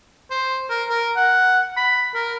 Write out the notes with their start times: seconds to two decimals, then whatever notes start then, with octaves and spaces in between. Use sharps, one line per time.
0.31 C5
0.70 A#4
0.90 A#4
1.16 F#5
1.77 B5
2.15 A#4